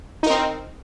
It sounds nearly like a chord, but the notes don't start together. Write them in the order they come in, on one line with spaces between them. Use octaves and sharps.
D#4 A#4 C4